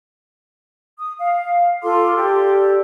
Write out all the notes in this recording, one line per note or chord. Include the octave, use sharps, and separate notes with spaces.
D#6
F5
F4 A4 C6 D6
G4 A4 D5